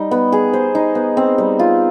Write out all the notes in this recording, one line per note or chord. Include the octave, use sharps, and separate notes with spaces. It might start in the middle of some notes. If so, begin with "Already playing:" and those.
Already playing: G3 D#4
B3
G#4
C5
D#4
B3
C4
G3
F4